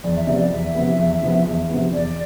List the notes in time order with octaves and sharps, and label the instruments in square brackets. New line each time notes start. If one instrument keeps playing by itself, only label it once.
[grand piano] E2 [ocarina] D5
[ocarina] E5
[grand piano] C3 F3 B3 [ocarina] D5
[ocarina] D5
[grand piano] E2 [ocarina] E5
[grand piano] C3 F3 B3
E2
C3 F3 B3
E2
C3 F3 B3
[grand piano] E2 [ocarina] D5